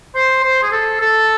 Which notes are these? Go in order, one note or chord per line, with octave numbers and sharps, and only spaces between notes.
C5
C5
G#4
A4
A4